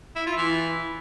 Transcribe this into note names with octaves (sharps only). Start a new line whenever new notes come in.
E4
F4
E3